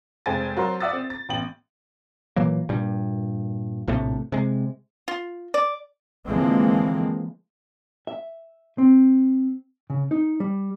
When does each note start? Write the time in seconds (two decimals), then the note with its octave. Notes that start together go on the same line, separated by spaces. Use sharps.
0.26 F1 G#3 C5 G5 G#5 A6
0.57 F#3 F#4 A#4 C5 C6
0.80 D5 E5 F#5 D#6 E6 A6
0.93 C4
1.10 A6
1.29 A1 B3 G5 F#7
2.36 A#2 E3 F#3 A#3
2.69 G2 A#2 G3
3.88 A#1 A2 C3 A3
4.32 C3 G#3
5.08 F4
5.54 D5
6.28 D3 E3 F3 G#3 A#3 C4
8.07 E5
8.78 C4
9.90 C#3
10.11 D#4
10.40 G3